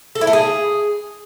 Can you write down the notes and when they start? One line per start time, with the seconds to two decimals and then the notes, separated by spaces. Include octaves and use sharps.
0.15 A4
0.21 E4
0.27 A3
0.33 G#4